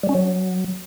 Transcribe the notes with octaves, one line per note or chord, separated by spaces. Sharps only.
G3
C#4
F#3